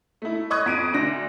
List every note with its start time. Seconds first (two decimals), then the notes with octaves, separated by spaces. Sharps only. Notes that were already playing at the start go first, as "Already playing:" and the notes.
0.22 A3 E4
0.50 D#5 B5 C#6 D#6 F#6 G#6
0.66 F2 D7 D#7
0.93 D2 D4 A#6